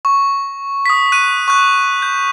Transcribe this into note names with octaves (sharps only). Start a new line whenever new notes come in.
C#6
D#6 B6
F#6 D#7
C#6 F#6
G6